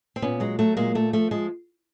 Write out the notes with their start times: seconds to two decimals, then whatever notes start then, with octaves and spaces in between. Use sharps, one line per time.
0.16 C4
0.22 A#2 B3 C#4
0.40 F#3 G#3
0.58 F#3 A3
0.76 A#2 G#3 A#3
0.95 A#2 A3
1.13 F3 A3
1.31 F3 G#3